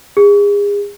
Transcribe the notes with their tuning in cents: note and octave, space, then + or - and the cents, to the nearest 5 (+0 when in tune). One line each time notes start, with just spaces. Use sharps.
G#4 -35